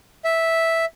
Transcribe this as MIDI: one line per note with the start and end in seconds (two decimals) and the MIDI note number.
0.24 0.85 76